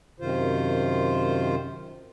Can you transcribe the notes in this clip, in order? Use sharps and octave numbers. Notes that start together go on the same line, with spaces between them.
F#2 C3 D#3 F4 C5